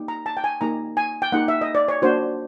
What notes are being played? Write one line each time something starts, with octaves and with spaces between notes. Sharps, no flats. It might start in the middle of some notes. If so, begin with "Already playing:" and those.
Already playing: A#3 D#4 G4
A#5
A5
G5
G#5
A#3 D#4 G4 A#5
G#5
G5
A#3 D#4 G4 F#5
E5
D#5
D5
C#5
A#3 D4 F#4 C5